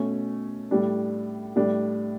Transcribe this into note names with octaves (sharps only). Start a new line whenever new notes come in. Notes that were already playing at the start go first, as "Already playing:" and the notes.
Already playing: B2 A3 C#4
A2 G3 D4
A2 G3 D4